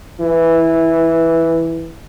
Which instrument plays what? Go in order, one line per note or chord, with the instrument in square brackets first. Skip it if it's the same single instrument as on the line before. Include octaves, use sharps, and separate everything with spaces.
[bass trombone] E3